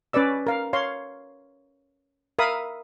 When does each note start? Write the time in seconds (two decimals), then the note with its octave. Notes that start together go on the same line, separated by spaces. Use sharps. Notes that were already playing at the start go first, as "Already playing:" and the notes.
0.13 C#4 B4 C#5 D5 E6
0.47 A#4 F5
0.73 C#5 F5 C6
2.39 A#4 E5 F5 B5 D#6